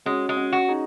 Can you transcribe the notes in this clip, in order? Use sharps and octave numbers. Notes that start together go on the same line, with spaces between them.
G#3 C#4 F#4
G#3
C#4 F#4
F#4
D#4 G#4